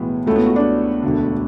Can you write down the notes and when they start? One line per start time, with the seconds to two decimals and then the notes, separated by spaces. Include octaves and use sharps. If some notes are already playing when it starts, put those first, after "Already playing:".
Already playing: B1 A2 E3 G#3 B3
0.26 C#2 B2 G#3 A3 C#4 E4
0.36 B3
0.46 F#4
0.56 D4
1.02 E1 D2 D3